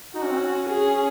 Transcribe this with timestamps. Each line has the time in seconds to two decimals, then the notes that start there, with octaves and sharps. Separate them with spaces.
0.15 D#4 F#4
0.23 C#4
0.30 C4
0.38 C#4
0.69 G#4